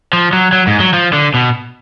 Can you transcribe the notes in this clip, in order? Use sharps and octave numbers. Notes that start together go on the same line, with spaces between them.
F3
F#3
F#3
G#2
F#3
F3
D3
B2